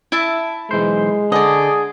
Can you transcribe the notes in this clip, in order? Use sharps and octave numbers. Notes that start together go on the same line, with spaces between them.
E4 E5 A5
B1 E3 G#3 C5
D3 G#4 D5 D#5